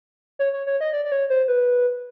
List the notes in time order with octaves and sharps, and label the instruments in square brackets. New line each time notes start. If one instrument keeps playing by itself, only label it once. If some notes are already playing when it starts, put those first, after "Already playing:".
[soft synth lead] C#5
C#5
C#5
D#5
D5
D5
C#5
C5
B4